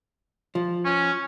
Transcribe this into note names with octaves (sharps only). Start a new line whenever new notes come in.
F3
C#4